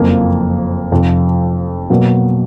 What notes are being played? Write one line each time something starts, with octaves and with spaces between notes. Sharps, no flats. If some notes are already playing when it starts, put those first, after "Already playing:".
Already playing: F#1 F2 F3 A#3
F1 F2 F3
B2 F#3 A#3